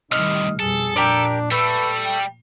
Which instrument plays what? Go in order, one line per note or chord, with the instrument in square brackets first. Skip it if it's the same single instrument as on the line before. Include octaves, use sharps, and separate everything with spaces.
[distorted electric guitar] A2 C3 [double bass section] D#3 G3 [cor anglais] D#5 [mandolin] F6
[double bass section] F2 B2 G3 [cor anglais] G#4 [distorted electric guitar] A4
[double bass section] A#2 [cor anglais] D4 [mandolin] G4 A#4 D5
[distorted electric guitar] G3 [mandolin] A3 A4 [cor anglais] B4
[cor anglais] G5